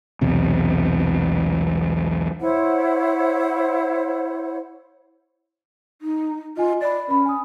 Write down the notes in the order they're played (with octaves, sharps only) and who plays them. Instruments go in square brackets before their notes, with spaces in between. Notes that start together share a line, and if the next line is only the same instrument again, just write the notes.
[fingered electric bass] B1 E2 C3
[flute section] E4 C5 C#5 F#5
[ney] D#4
[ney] F4 [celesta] D#5 G#5
[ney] D5 [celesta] B5 A6
[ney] C#4 [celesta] B4 B5
[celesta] G#5 D#6